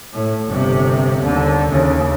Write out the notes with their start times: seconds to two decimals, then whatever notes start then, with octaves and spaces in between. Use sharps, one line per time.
0.13 A2
0.48 G1 C3
1.21 D#2 D3
1.70 D#2 C#3